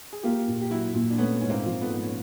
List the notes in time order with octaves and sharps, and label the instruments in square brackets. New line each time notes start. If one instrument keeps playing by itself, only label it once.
[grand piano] G#4
[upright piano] A#3 [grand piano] F4 G4
[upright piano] A#2
[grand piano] G4
[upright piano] F#3 [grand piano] E4 F#4
[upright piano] A#2
[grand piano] D4
[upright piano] A3 [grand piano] B3 C#4
[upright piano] G#2 [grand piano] C#4
[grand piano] A#3 C4
[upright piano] F3
[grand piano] A3 B3
[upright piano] G#2
[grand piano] C#4